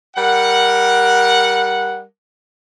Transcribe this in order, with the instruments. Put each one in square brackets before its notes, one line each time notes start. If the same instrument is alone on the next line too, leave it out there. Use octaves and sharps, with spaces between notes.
[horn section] G3 A#4 F#5